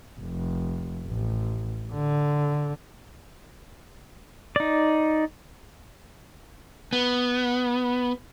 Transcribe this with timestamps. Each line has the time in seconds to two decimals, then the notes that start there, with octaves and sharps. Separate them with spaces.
0.19 F1
1.06 A1
1.92 D3
4.56 D#4 D5
6.93 B3